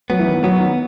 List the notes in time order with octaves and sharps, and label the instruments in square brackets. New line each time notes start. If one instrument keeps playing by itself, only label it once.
[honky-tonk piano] F#3 [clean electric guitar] B3
[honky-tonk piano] E3
D#3
[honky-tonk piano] F#3 [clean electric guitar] B3
[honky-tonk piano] D#3